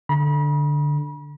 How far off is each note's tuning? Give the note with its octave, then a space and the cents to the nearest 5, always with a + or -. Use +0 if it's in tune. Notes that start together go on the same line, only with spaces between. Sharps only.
D3 +0 B5 -40